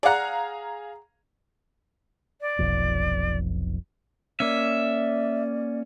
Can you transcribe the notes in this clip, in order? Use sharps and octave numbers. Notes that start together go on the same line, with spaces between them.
G#4 D5 F5 F#5 A#5
D5
F1 B1 F2
A#3 C#4 D5 E5